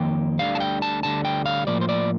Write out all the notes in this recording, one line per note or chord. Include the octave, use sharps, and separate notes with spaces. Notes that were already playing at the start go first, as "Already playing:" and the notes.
Already playing: F2 D#3 A#3 G5
D2 D3 G3 F5
A5
G5
A5
D2 D3 G3 A5
G5
F5
A2 F3 A#3 D5
C5
D5